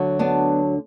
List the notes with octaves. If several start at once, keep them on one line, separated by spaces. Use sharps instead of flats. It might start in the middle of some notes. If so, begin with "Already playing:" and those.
Already playing: D2 D3 F#3
B3 D4